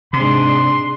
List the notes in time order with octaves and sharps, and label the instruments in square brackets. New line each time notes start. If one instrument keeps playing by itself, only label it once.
[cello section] G#2 D4 G#4 [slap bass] C3 [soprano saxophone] C6